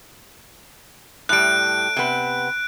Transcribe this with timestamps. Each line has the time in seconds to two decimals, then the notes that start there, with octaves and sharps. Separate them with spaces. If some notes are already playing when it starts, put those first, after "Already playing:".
1.29 A2 G3 F#6 D7
1.97 C3 B3